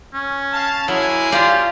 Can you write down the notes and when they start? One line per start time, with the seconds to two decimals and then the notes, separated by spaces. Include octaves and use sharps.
0.14 C#4
0.52 F5 A5
0.88 F#3 G#3 A#3 E4 G#4
1.32 F4 G4 D5 F5 A#5